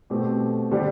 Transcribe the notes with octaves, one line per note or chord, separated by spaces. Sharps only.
B2 A3 C4 G4
D3 G3 D4 G4 C5